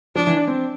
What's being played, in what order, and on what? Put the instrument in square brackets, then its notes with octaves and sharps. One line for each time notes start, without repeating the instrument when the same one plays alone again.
[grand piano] F3 [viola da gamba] D4
[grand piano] E3
D4
C4